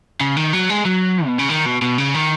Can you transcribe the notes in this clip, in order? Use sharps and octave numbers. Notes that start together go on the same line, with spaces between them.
C#3
D#3
F#3
G#3
F#3
B2
C#3
D#3
B2
B2
C#3
D#3